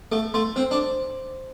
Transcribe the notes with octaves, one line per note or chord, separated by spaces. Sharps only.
A3 A4
A3 C6
C4 C5
D4